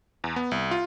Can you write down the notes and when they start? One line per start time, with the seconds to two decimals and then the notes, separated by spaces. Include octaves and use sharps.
0.24 E2
0.36 B3
0.51 C2
0.71 F4